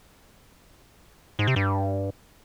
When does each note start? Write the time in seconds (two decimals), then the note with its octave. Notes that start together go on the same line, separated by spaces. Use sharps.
1.39 G#2
1.47 C3
1.56 G2